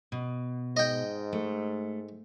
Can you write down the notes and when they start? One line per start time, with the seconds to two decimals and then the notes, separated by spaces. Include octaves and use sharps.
0.12 B2
0.77 G#2 D#5 G5
1.33 A3